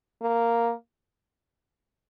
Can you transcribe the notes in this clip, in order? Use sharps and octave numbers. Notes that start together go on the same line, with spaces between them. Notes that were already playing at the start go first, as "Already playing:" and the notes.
A#3